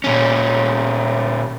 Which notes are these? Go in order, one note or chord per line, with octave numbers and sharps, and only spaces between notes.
A#2 C#4